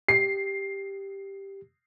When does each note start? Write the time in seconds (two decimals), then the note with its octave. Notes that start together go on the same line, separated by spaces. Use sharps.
0.08 G4 C7